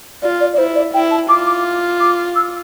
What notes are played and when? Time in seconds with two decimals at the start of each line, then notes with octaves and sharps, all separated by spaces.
0.22 F4 D5
0.41 D5
0.53 D5
0.58 E4 C5
0.75 D5
0.94 E4 G5
1.11 A5
1.29 F4 D6
1.46 D6
2.00 D6
2.36 E6